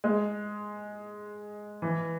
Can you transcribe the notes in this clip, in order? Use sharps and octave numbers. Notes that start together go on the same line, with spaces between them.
G#3
E3